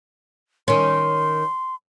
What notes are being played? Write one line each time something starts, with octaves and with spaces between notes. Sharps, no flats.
D#3 C#4 C6